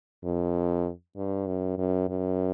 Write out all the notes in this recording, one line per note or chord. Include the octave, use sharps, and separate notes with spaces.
F2
G2
F#2
F#2
F#2